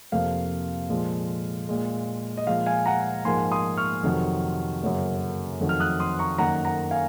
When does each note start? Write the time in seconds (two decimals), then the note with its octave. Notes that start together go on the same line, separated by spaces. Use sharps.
0.12 F2 C3 F3 A#3 F5
0.90 A#2 F3 G#3
1.69 A#2 G#3
2.38 D#5
2.47 A#2 F3 G#3 F5
2.66 F5 G#5
2.86 F#5 A#5
3.25 G#2 F3 A#3 G#5 C6
3.52 C6 D#6
3.77 C#6 F6
4.03 F2 C3 D#3 F#3
4.82 F#2 C#3 F#3 A#3
5.61 F2 D#3 F#3
5.69 F6
5.80 D#6 F#6
6.00 C6 D#6
6.19 A#5 C#6
6.38 F#2 D#3 A#3 F#5 A#5
6.65 F#5 A#5
6.91 F5 G#5